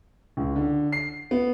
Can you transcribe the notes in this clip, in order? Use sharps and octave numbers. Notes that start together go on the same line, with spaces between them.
C#2
D3
C7
B3